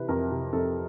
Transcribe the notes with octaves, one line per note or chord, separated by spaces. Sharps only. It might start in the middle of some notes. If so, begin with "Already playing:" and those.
Already playing: C3 E3 B4
F2 A#4
C3
F2 A4